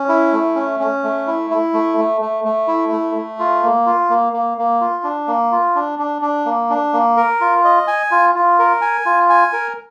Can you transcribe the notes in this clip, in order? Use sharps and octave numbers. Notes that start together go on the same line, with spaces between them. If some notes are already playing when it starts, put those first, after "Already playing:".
Already playing: C#4
E4
A3
C#4
C#4
A3
E4
E4
A3
A3
A3
A3
E4
A3
A3
F4
A#3
F4
A#3
A#3
A#3
F4
D4
A#3
F4
D4
D4
D4
A#3
D4
A#3
A#4
F4
D#5
G#5
F4
F4
A#4
G#5
F4
G#5
A#4